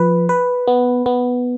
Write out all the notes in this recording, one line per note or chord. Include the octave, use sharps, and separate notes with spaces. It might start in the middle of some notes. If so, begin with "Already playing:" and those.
Already playing: F3 B4
B4
B3
B3